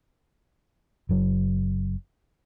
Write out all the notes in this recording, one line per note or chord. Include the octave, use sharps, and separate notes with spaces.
F#1 F#3